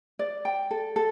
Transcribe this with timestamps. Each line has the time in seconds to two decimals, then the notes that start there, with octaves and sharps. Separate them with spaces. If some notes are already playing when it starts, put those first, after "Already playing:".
0.19 D5
0.45 G5
0.71 A4
0.96 A4